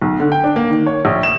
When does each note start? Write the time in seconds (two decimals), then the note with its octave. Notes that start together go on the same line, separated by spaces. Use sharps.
0.02 B1
0.20 D3
0.32 G5
0.44 D4
0.56 A#3
0.70 D#3
0.86 C#5
1.05 A#1
1.23 E7